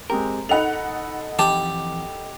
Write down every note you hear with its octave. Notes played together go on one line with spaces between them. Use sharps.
G#3 C4 G4 A#4
D#4 A4 D#5 F#5 B5 F7
F2 E3 G4 A5